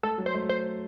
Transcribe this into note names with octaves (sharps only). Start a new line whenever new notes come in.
A3 A4
F#3
C5
A3
C5